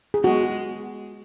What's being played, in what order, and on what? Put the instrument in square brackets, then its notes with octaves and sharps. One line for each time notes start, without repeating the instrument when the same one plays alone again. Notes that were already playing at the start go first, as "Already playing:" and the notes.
[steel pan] G#4
[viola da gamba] G#3 B3 [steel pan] F#4